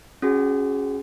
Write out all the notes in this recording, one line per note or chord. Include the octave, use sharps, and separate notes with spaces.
C#4 F#4 G#4